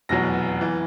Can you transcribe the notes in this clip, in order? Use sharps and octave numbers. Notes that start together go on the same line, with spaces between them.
F1 E2 B2 F#3 A#6
E3